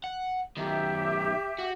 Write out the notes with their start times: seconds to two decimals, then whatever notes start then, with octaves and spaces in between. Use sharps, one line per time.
0.04 F#5
0.57 B1 D#3 G4 E5
1.59 F#4